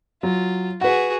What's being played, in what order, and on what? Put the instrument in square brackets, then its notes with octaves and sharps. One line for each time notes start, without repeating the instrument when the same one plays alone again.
[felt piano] F#3 [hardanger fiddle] F4
[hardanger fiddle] F#4 G#4 [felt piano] B4 F#5